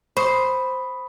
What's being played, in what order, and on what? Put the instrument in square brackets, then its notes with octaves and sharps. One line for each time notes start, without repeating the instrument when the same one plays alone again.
[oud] C5 [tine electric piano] B5 C#6 D#6